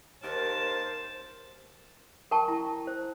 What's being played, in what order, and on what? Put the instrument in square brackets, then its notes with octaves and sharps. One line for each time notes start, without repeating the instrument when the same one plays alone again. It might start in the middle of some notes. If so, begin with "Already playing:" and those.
[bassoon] D#2 [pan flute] A#4 [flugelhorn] C5 [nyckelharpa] A5
[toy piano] A#4 G5 A5 C#6
E4
C5